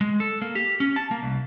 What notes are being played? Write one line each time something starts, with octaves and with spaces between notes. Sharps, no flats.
G#3
A4
A#3
G4
C#4
A5
A#3
C2